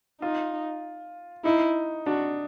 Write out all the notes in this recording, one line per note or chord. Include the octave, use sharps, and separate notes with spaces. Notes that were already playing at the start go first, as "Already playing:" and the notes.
D#4 F4
D#4 E4
D4 F#4